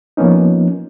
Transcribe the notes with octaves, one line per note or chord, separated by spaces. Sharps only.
F3 A#3 B3 C#4 D#4